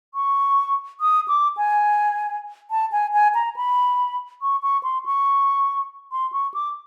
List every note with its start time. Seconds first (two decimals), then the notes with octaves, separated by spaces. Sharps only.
0.14 C#6
1.01 D#6
1.28 D6
1.57 G#5
2.71 A5
2.92 G#5
3.13 G#5
3.35 A#5
3.56 B5
4.42 C#6
4.63 C#6
4.83 C6
5.06 C#6
6.12 C6
6.33 C#6
6.54 D6